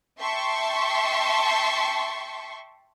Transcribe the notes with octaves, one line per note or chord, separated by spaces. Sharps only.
E5 G5 A5 C6 C#6